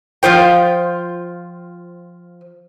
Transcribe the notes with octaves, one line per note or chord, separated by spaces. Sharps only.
F3 F4 C5 G5